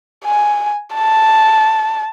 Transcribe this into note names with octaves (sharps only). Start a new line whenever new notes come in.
G#5
A5